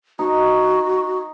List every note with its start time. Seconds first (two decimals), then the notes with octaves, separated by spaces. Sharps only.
0.19 D#4 F#4